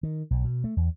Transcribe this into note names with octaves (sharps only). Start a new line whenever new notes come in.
D#3
B1
B2
A3
E2